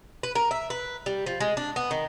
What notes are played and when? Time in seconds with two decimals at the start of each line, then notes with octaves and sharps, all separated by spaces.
0.23 B4
0.35 A#4
0.51 E5
0.70 B4
1.06 G3
1.26 F3
1.40 G#3
1.57 D4
1.76 B3
1.91 D#3